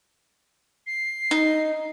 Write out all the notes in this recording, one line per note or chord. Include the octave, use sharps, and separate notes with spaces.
C7
D#4